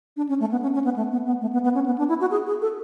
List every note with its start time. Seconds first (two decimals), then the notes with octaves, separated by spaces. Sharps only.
0.17 D4
0.29 C#4
0.40 A3
0.51 B3
0.62 C#4
0.74 C#4
0.84 B3
0.96 A3
1.12 B3
1.26 B3
1.41 A3
1.53 B3
1.64 B3
1.74 C#4
1.86 B3
1.98 D4
2.09 E4
2.21 F#4
2.31 G#4
2.46 G#4
2.62 A4